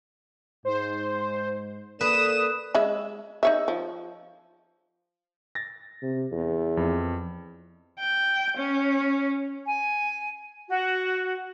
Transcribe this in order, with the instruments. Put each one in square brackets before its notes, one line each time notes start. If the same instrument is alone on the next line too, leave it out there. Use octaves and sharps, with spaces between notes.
[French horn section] G#2 [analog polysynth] C5
[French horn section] A#3 A4 D5 [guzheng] B4 [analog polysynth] D#6 [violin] E7
[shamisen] G#3 E5 B5
D#4 C#5 E5
F3
[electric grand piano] A6 A#6
[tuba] C3
E2
[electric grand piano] F2
[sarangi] G5
C#4
[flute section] G#5
F#4